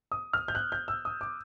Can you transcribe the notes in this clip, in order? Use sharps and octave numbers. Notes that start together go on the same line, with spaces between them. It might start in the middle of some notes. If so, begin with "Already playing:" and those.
D#6
F6
G6
F#6
G6
E6
D#6
D6